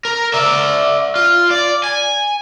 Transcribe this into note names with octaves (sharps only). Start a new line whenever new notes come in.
A#4
D5 E5
F4
D5
G#5